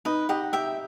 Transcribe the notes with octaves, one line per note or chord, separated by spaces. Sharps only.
D#4 B4 D#5
G4 D#5 F#5
G4 E5 G5